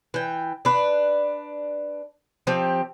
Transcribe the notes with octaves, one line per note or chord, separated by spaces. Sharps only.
E3 G5
D4 B4
F3 C4 G4